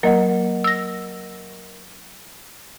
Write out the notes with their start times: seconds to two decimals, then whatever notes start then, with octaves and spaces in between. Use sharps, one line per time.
0.03 F#3 A#3 A#4 D#5 F#5
0.64 E6 A#6